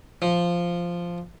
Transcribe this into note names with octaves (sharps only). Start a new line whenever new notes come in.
F3